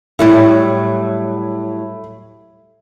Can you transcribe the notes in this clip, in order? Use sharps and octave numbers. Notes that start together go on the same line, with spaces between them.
A2 F#3 G3 E4